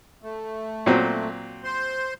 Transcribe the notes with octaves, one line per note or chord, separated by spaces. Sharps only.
A3
A#2 F#3 C4
C5 C6